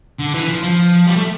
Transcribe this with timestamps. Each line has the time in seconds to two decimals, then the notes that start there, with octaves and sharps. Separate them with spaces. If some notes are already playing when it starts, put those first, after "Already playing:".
0.19 D3
0.34 E3
0.49 F3
0.64 F3
1.07 G3
1.16 A3